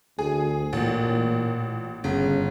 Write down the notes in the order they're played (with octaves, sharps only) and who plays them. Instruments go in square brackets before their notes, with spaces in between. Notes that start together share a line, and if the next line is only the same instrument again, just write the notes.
[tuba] D2 [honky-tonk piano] G#4
[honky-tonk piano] A1 [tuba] A#2
[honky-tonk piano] G1 [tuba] C#3